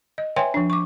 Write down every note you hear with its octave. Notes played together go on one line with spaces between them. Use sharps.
D#5
B4 C#5 E5 G5 G#5 C6
F3 D4
C#6 D6